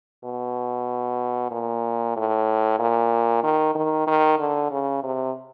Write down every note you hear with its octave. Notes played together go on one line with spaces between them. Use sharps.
B2
A#2
A2
A#2
D#3
D#3
D#3
D3
C#3
C3